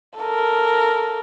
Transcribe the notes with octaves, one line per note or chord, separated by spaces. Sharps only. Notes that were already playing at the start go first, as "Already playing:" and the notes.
A4 A#4